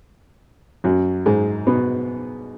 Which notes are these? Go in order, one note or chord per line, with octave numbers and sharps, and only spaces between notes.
F#2 F#3
G#2 G#3
B2 B3